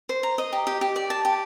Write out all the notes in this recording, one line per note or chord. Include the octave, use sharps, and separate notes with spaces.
C5
A#5
D#5
G4
G4
G4
D5
A5
G4